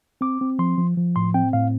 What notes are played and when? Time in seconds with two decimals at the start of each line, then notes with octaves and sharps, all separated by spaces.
0.21 C4 D6
0.41 C4
0.59 F3 C6
0.78 F3
0.97 F3
1.16 A2 C6
1.34 C4 G5
1.53 A2 F5